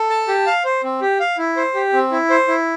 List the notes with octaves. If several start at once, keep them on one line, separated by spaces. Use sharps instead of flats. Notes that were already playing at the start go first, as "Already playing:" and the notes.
Already playing: A4
A5
G4
F5
C5
C4
G4
F5
E4
C5
G4
C4
E4
C5
E4